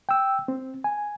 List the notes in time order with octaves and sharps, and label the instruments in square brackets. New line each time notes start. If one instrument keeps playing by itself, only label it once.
[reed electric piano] G5 E6
C4
G#5